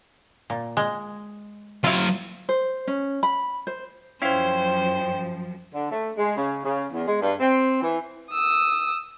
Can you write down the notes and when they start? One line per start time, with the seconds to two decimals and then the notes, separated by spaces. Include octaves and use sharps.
0.50 A#2
0.77 G#3
1.84 F#3 E4 F4 F5
2.49 C5
2.87 C#4
3.23 B5
3.67 C5
4.22 F#2 F3 C#4 E4 C5 F5 G5
5.75 D3
5.92 A3
6.17 G#3
6.37 C#3
6.65 C#3
6.92 E2
7.08 G#3
7.22 G2
7.40 C4
7.82 E3
8.32 D#6 E6